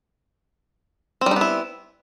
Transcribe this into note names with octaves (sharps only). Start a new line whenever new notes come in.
G3 B3 C4 D#4 E4